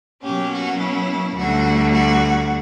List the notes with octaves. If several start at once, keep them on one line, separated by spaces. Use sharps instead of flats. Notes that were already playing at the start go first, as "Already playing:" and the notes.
B2 F#3 A#3 C#4 G4
F#4
E4
D2 D3 G3 F#4
F#4